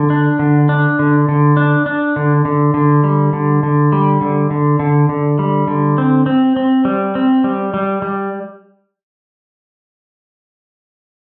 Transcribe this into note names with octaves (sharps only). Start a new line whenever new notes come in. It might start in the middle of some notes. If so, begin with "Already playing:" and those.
Already playing: D3
D4
D3
D4
D3
D3
D4
D4
D3
D3
D3
G3
D3
D3
G3
D3
D3
D3
D3
G3
D3
C4
C4
C4
G3
C4
G3
G3
G3